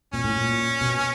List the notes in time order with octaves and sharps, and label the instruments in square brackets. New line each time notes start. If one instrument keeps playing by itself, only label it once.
[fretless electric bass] A#2 [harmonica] C#4
[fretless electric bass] A2
A#2
B2